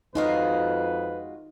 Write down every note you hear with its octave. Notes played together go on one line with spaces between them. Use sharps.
F2 G#3 D#4 F4 F#4 B4 D#5 F5